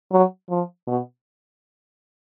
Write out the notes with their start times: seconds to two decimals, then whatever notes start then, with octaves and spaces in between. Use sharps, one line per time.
0.11 F#3
0.50 F3
0.87 B2